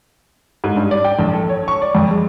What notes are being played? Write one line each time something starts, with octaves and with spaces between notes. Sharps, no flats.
G#2
G2
D5
G5
A#1
A4
C#5
C#6
D5
F2
G#3